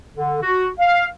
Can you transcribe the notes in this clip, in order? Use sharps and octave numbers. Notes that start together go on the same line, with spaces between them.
D3
F#4
F5